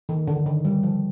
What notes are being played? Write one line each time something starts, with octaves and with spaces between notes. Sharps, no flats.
D#3
D3
D#3
G3
F3